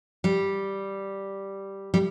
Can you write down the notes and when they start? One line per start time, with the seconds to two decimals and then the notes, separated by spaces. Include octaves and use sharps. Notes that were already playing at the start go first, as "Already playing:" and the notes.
0.24 G3
1.94 G3